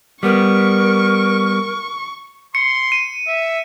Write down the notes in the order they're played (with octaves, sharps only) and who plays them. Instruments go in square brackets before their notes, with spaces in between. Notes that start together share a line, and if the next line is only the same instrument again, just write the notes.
[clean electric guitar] G3 B3 [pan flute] A#4 [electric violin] C#6
[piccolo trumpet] C6 [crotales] C#7
[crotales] D#7
[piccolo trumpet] E5